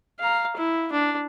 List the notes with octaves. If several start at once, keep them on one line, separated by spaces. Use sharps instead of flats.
F5 A#5
E4
D4